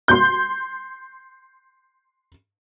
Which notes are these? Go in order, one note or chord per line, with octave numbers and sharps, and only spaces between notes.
C6 G6